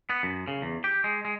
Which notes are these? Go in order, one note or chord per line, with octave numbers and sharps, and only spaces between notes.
B3
F#2
C#3
E2
G4
G#3
G#3